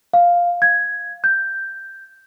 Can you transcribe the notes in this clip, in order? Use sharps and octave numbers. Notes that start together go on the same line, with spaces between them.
F5
G#6
G6